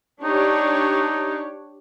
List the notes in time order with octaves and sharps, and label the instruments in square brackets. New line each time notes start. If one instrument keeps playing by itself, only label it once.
[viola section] D4 G4 C#5 [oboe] D#4